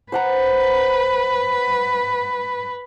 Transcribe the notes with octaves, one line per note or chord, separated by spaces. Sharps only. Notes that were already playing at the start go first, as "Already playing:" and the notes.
B4 C5 F#5 A#5